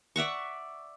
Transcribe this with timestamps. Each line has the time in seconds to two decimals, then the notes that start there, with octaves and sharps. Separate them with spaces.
0.16 D5 E5 F#5 C#6